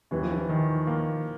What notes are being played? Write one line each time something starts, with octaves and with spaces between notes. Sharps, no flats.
D#2 E3
F3
E3
D#3
A#3